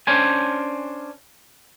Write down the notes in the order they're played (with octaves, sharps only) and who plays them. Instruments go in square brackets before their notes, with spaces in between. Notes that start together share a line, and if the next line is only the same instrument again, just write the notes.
[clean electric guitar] C#4 D4 C5 G#5